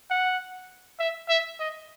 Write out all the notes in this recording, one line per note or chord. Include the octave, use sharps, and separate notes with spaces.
F#5
E5
E5
D#5